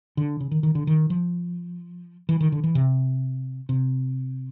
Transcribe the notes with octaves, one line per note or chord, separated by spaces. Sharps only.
D3
C#3
D#3
D#3
D3
D#3
F3
E3
D#3
D3
E3
C3
C3